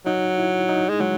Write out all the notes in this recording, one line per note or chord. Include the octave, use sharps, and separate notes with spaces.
F#3 D#4
E4
D#4
G#3
F#3 G#3